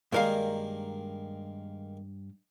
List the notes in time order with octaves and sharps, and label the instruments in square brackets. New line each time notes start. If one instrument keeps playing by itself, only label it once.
[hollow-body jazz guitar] G2 A#4 F5 [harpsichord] D#3 G#3 A#3